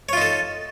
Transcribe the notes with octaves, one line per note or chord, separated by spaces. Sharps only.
D#4 F4 A4 C#5